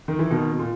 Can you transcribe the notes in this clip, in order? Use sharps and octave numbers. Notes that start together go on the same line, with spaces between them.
D#3
E3
B2 D#3
B2
A#2